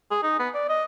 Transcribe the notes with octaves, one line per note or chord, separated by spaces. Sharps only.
G#4
D#4
B3
D5
D#5